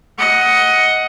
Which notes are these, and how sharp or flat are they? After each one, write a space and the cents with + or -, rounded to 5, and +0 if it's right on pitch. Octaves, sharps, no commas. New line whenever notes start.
D#5 +15 F#5 +0